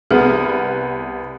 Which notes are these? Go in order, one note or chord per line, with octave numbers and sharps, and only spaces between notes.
C2 B3 G#4